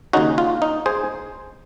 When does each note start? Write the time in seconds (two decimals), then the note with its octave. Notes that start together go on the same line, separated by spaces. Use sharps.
0.13 D#2 C#3 G#3 C#4 D#4 F#4
0.38 F4
0.62 D#4
0.86 G#4 C5